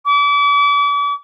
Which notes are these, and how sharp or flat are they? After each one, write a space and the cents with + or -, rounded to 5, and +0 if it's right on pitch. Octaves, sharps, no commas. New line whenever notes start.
D6 -40